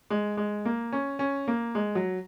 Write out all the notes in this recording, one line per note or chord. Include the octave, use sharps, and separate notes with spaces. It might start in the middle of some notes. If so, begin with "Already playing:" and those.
G#3
G#3
A#3
C#4
C#4
A#3
G#3
F#3